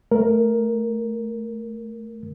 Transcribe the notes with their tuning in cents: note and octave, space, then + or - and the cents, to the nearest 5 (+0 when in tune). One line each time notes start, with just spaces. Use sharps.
A3 +0 A#4 +5